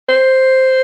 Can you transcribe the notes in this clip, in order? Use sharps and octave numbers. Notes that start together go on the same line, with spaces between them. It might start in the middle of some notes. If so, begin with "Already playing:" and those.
C5